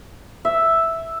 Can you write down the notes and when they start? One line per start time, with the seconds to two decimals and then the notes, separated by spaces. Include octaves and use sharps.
0.45 E5